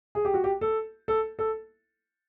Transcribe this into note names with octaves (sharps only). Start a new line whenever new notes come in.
G#4
G4
F#4
G4
A4
A4
A4